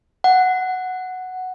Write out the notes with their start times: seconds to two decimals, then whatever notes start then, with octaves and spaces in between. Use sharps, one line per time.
0.24 F#5